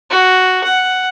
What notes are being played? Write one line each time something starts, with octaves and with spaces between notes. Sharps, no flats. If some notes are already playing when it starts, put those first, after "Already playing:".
F#4
F#5